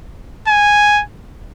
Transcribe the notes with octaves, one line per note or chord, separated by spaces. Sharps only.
G#5